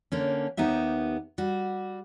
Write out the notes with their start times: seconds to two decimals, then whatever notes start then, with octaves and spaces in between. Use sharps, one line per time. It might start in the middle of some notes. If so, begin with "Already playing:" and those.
0.12 D3 A#3 C#4
0.57 D#2 B3 D#4 G4 E5
1.38 G3 F#4